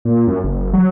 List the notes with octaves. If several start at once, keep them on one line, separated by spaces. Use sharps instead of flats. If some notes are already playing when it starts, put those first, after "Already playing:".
A#2
F#2
F#1
F#3